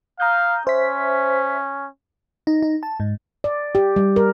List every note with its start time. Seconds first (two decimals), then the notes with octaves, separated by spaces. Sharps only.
0.20 F5 A#5 D#6 G6
0.67 C#4 C5 E5 B6
2.47 D#4
2.62 D#4
2.83 A5
3.00 G#2
3.44 D5
3.75 G4
3.96 G3
4.16 A#4